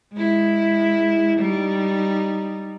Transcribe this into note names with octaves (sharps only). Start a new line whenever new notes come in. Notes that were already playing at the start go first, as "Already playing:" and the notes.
G#3 E4
G3 D#4